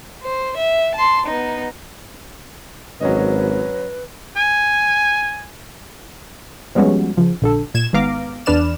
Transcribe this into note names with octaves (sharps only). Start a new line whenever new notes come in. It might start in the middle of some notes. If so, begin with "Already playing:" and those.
C5
E5
A5 C6
B3 D#4
G#1 F#3 C#4 B4 D#5
G#5
F3 G3 G#3 B3 C#4 F#4
C#3 F3
A#1 D3 A4
A#2 G#6 E7
G#1 G#2 B3 F5 A#5 D6
E2 D4 B4 D5 F6 E7